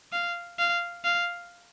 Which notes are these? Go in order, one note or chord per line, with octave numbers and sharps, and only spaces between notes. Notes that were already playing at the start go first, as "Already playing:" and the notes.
F5
F5
F5